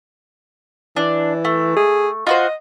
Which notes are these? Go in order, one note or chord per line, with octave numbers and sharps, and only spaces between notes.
E3 D4
A3
G#4
F4 F#4 C5 D#5